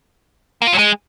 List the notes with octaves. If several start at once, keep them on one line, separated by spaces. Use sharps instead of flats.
A#3
F4
F#3
G#3